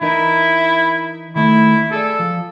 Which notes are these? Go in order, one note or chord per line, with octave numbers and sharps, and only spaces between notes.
E3 D#4 E4 A#4
D#3 A3 E4
G#4 A4 D5
F3